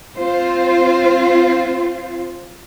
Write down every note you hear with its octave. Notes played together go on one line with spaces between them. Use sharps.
C4 F4 C5